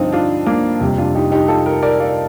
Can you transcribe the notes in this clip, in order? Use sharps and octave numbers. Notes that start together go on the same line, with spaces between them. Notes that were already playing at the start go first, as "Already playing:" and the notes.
Already playing: G2 D3 F3 C4 D4 D#4 F4
D4 F4
A#3 D4
F2 C3 G3
D4 F4
D#4 G4
D#4 G4
F4 A4
G4 A#4
A#4 D5
D5 F5